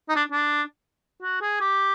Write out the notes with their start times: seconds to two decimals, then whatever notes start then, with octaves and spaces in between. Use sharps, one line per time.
0.08 D#4
0.15 D4
0.31 D4
1.22 F#4
1.41 G#4
1.60 G4